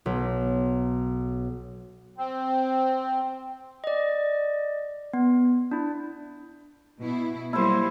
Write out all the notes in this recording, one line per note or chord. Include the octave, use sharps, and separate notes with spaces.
B1
C4
D5 D#5
B3
D4 E4
B2 E4
F#3 G3 A#3 E4 C5